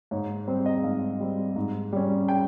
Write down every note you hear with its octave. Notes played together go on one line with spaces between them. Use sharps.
G#2 C#5
G3 C4 C5
D#5
G#2 F5
G3 C4
G#2
G3 C#4
G5